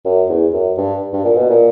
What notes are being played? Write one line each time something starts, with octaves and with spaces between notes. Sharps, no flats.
F#2
E2
F#2
G2
G2
A#2
B2
A#2